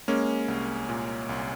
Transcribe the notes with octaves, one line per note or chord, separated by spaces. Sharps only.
G#3 A#3 C#4
C2
A#2
C2